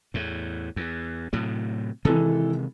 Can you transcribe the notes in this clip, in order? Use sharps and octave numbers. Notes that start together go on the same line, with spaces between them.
E2 A2
E2
A2 C3 F#3
C3 D#3 E3 G#3 A4